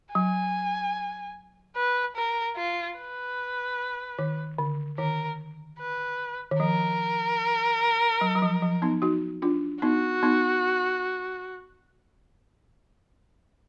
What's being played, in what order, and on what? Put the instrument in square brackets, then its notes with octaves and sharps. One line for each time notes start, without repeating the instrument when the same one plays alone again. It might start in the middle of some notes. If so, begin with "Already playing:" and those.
[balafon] F#3 [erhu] G#5
[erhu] B4
A#4
F4
B4
[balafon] D#3
D3
[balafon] D#3 [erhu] A#4
[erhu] B4
[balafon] D#3
[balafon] F3 [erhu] A#4
[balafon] F#3
F#3
F3
F3
B3 D#4
D#4 F#4
D4 F4
[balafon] B3 D#4 [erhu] F#4
[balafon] B3 D#4